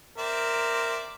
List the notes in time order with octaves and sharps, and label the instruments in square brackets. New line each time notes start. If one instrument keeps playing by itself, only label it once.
[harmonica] C4 D5 E5 [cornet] A#4